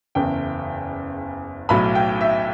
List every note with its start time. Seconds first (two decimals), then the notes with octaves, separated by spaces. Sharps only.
0.15 F#1 E2 C#3 G5
1.69 B1 A2 F#3 B5
1.95 G5
2.21 E5